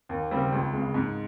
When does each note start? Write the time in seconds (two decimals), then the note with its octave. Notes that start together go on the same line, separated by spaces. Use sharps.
0.09 D#2
0.31 C#3 G3 C4
0.52 C#2
0.73 C#3 G#3
0.94 G#2